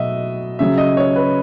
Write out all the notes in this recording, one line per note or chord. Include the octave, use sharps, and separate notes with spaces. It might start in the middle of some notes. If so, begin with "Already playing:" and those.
Already playing: B2 F#3 D#5 E5
C#3 F#3 E5
D#5
C#5
B4